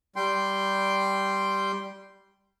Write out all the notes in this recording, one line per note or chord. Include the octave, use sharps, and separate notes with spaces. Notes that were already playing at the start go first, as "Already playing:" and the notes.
G3 G5 C6